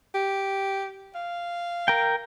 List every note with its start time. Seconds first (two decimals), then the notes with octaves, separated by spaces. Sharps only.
0.14 G4
1.15 F5
1.88 A#4 G5